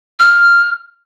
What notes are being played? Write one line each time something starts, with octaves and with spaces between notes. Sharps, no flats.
F6